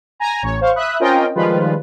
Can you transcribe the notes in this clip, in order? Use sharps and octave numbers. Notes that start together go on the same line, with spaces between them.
G#5 A#5
A1 C#5
C5 F5 C#6
E5 B5 D#6 F#6
C4 C#4 F4 A#4 D#5 G5
D#3 F3 G3 G#3 F4 B4